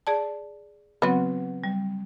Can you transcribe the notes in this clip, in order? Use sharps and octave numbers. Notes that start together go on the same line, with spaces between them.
G#4 D5 A5
C#3 F#3 B3 C4 F#4
G3